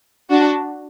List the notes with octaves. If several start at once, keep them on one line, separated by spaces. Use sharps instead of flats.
D4 F#4